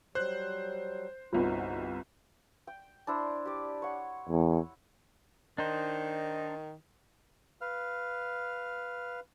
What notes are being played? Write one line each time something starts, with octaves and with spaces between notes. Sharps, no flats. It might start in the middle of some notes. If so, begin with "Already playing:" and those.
F#3 G3 C5 F#6
G1 C2 D#4 F4 F#4 B4
G5
D4 E4 C5
G4 D5
C#5 F#5
E2
D#3 D4 D#4 C5
B4 F5 F6